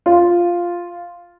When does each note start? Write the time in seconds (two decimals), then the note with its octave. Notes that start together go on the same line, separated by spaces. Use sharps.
0.06 F4